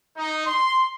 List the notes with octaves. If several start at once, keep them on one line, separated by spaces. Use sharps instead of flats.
D#4
C6